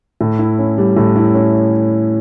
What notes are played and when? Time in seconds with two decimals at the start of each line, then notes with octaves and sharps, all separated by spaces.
0.21 A2
0.39 E4
0.59 C#4
0.78 G3
0.96 A2
1.16 E4
1.34 C#4